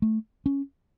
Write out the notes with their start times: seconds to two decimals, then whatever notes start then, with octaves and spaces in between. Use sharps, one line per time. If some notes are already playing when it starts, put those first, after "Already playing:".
0.02 A3
0.46 C#4